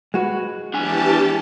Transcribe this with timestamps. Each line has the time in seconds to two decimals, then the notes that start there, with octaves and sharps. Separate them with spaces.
0.14 G#3 F#4 B4
0.74 E3 D4 G4 G#5 A5